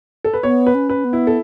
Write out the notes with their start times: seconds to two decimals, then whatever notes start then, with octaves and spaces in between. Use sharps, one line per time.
0.24 A4
0.34 B4
0.43 B3 C#5
0.67 B4
0.75 C#4
0.90 B4
1.05 B3
1.13 E4
1.27 A4